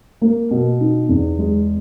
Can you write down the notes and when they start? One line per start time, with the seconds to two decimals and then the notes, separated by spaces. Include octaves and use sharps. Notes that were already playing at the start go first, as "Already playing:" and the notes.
0.22 A#3
0.51 B2
0.81 D#4
1.09 E2
1.38 G#3